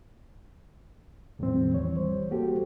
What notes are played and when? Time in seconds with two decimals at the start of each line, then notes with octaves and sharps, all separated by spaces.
1.39 E2 A2 D#3 F3 G3 C4
1.74 E3 C#5
1.97 G3 C5
2.31 A#3 F#4 G4 A4